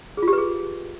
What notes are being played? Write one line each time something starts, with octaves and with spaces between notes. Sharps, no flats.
G#4
F4
G4
B4
G#4